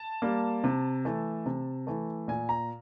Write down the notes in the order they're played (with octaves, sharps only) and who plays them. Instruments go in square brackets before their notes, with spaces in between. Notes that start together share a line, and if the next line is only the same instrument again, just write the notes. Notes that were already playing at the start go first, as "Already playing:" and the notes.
Already playing: [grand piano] A5
G3 A#3
C3
E3 A3
C3
E3 A3
A#2 G#5
A#5